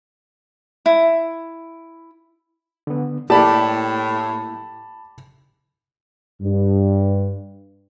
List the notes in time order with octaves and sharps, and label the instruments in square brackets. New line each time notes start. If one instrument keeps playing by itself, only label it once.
[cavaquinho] E4
[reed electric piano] D3 B3
[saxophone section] A2 [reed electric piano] A#3 E4 [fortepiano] G4 D5 [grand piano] A5 B5
[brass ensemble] G2